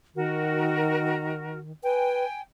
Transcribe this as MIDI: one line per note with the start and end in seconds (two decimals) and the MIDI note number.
0.15 1.72 51
0.15 1.58 66
0.15 1.58 70
1.84 2.25 71
1.84 2.40 79
1.84 2.40 80